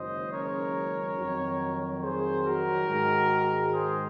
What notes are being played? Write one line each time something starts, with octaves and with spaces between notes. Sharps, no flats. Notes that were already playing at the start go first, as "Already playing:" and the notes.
Already playing: F#1 F#2 D#3 G#3 C#4 C5 D#5
A#4 C#5
F2 D#3 F#3
G#4 C5
F#4 A#4
G#2 D#3 G#3
G#4 C5